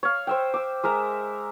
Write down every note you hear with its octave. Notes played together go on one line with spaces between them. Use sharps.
C#5 F5
C5 E5 G5
D6 E6
G#3 A#4 E5 A#5